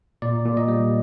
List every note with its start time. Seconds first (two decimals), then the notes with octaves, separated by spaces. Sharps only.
0.22 A#2 D5
0.45 A#2
0.57 D#5
0.68 G3